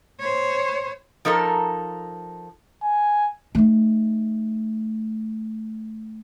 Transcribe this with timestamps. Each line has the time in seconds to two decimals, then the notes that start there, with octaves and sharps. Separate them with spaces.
0.20 C5 C#5
1.25 F3 D#4 A4 A#4
2.83 G#5
3.55 A3 D#4